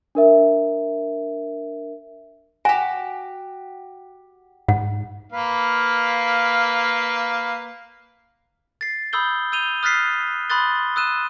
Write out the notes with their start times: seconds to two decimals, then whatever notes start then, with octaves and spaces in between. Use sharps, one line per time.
0.15 D4 A#4 E5
2.65 F#4 G4 G#5
4.68 G#2 F#5
5.32 A#3 B4 F5
8.81 A6 C7
9.13 B5 D#6 E6 G6 G7
9.52 E6 G6 D#7 F7 G7
9.83 D#6 F6 F#6 A6 B6 C7
10.50 B5 C6 D#6 F#6 A6 G7
10.96 D#6 E6 F#6 D#7 E7